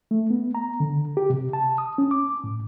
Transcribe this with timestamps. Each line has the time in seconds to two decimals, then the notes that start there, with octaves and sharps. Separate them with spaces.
0.11 A3
0.30 B3
0.55 A#5
0.80 D3
1.17 G4
1.30 C3
1.53 A5
1.78 D#6
1.98 C#4
2.11 D6
2.44 A2